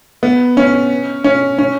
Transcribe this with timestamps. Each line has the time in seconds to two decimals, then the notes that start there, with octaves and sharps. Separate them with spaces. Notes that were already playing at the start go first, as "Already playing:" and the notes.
0.23 B3
0.57 C#4
1.24 C#4
1.58 C#4